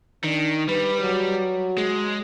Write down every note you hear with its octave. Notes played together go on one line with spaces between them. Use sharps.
D#3 D4
G3 B4
F#3
G#3